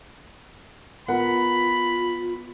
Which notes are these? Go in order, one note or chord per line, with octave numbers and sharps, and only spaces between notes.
B3 F4 A#4 F#5 B5